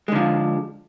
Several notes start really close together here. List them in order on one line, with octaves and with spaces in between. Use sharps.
G#3 D3 F3